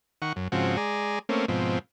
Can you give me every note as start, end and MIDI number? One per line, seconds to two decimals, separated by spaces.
0.22 0.33 51
0.22 0.33 78
0.22 0.33 85
0.36 0.48 42
0.52 0.77 44
0.52 0.77 49
0.52 0.77 53
0.52 0.77 60
0.52 0.77 66
0.77 1.19 56
0.77 1.19 68
0.77 1.19 74
0.77 1.19 82
1.29 1.46 57
1.29 1.46 58
1.29 1.46 60
1.29 1.46 61
1.48 1.79 44
1.48 1.79 47
1.48 1.79 53
1.48 1.79 60